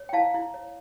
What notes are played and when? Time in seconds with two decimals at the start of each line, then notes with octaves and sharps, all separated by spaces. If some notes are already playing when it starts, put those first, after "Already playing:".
Already playing: C#5
0.09 G5
0.13 E4 F5 A5
0.34 E4
0.54 C#5